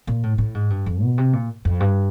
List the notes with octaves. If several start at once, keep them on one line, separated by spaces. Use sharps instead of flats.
A#2
A2
A2
G#2
G2
F2
B2
C3
A#2
F2
G2